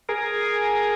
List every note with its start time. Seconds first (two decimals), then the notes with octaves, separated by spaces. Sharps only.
0.09 G#4 A#4